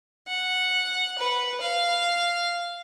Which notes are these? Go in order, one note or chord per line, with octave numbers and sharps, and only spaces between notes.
F#5
B4
F5